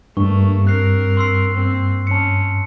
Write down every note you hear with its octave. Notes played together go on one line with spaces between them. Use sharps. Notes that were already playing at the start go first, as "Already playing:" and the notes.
G2 A3 A#3 C#6
C4 A#4 F#6 C7
C6 E6 C7
A#3 C4
C#4 A5 C#7